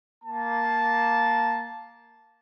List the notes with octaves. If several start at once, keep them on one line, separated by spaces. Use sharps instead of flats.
A#3 A5